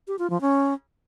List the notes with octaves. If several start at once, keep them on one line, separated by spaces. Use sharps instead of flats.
G4
F4
F3
C#4